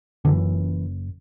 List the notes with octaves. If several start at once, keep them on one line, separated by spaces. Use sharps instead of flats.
F#1 F#2 D3 E3